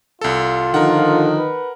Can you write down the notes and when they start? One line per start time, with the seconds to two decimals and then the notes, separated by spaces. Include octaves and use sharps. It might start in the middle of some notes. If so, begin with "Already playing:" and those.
0.21 C2 F4 A4
0.74 D3 D#3 F3 A#4 F#5
1.38 B4